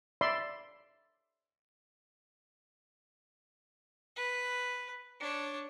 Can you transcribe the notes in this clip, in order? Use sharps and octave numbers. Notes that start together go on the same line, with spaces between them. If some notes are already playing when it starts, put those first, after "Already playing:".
D5 E5 B5 C6
B4
D4 C#5